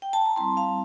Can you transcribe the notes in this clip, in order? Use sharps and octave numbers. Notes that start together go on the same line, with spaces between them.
G5
A5
A#5
G3 C4 E4 A5 C6
F5 A5